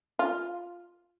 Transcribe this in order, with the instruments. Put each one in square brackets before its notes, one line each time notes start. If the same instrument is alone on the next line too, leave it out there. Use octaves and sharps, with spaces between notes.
[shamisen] F4